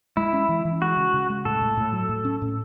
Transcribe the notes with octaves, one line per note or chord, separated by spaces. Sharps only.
G#3 E4
C#4
E3
E3
G#3 F#4
C#3
C#3
G#3
A2 A4
A2
A2
F#3
A2
C#4
A2